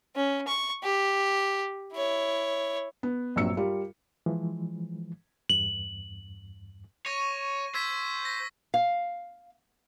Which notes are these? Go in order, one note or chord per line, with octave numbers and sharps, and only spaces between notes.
C#4
C#6
G4
E4 C#5
B3
A#1 G2 F#3 C4 E6 C#7
G3 F4 A#4
E3 F3 G#3
E2 G2 F#7
C#5 C#6 A#6 D#7
C5 E6 G#6 B6
A#6 B6
F5